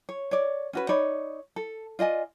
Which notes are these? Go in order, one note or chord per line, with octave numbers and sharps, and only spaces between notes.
C#5
C#5 D5
C#4 F#4 B4
D#4 C#5 D5 B5
A4
F4 D5 D#5 G#5